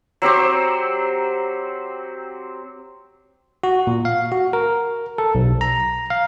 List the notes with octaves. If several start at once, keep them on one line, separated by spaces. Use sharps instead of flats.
F#3 C4 G4 C5
F#4
A#2
F5
F#4
A#4
A4
B1
A#5
F5